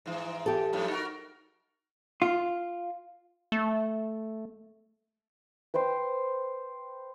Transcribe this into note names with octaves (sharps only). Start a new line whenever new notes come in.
G#2 E3
G4 A4
F#2 A2 F3
D#4 F#4 A#4
F4
A3
B4 C5 G5 C6